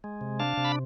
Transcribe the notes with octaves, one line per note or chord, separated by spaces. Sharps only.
G#3
C3
D4 F5 A5
C3
B5